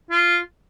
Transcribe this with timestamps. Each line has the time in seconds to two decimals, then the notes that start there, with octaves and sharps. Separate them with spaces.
0.11 F4